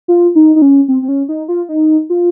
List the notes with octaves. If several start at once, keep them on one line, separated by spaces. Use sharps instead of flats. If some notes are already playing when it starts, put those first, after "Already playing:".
F4
D#4
D#4
C#4
C4
C4
C#4
D#4
F4
D#4
F4